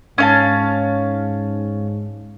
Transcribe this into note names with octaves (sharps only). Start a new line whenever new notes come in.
G#2 C#4 F5 A5